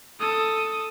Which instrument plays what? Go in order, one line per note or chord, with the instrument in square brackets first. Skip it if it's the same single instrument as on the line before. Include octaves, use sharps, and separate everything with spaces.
[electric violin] A4 D#6